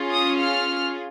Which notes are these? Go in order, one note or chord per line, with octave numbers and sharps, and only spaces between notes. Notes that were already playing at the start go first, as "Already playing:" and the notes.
Already playing: C#4 F4 G#4
D#6
F6